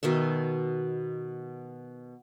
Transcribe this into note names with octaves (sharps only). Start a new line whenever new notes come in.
B2 D#3 D#5 E5